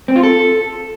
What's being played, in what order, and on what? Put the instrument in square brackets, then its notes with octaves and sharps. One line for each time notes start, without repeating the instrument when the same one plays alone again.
[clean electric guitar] C4
F4
A4